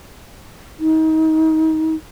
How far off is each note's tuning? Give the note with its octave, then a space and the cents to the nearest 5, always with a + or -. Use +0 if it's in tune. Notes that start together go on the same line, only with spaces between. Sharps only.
D#4 +30